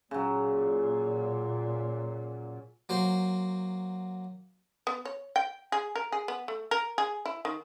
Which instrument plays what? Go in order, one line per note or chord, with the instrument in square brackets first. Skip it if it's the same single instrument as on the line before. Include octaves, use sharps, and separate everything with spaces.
[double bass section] A#2 [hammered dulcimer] C#3 F#3
[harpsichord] F#3 A#3 C5
[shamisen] B3
C#5
G5
G#4
A#4
G#4
B3
A3
A#4
G#4
E4
D#3